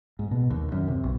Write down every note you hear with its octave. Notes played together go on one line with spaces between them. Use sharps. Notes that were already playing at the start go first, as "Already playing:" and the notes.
G#2
B2
D#2
F#2
C3
B1